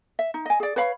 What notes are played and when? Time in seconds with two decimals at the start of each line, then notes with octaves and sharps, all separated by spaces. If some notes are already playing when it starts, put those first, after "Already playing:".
0.19 E5
0.34 D#4
0.46 D#5 G#5
0.60 G#4 D5
0.76 B4 C#5 F5 B5